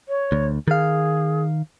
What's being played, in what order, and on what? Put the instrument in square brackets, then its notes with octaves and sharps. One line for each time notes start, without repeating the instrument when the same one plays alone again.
[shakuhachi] C#5
[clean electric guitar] D2
[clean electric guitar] D#3 F5 [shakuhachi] G#4